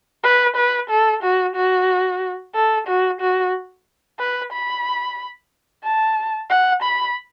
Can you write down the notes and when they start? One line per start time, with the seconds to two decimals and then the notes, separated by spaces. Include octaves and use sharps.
0.24 B4
0.56 B4
0.90 A4
1.23 F#4
1.55 F#4
2.55 A4
2.87 F#4
3.21 F#4
4.19 B4
4.52 B5
5.84 A5
6.50 F#5
6.83 B5